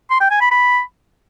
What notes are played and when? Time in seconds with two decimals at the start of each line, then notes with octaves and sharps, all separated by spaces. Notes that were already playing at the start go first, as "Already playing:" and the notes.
0.10 C6
0.20 G5
0.31 G#5
0.41 B5
0.51 B5